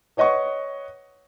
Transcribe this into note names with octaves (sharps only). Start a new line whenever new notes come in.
B4 C#5 D#5 F#5 C#6